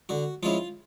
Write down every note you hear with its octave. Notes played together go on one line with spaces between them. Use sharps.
D3 F#4
F3 G#3 C#4 E4 F4